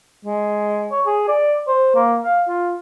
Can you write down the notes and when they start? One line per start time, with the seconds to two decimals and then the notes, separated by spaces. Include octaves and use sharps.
0.25 G#3
0.91 C#5
1.06 G#4
1.28 D5
1.68 C5
1.95 A#3
2.24 F5
2.48 F4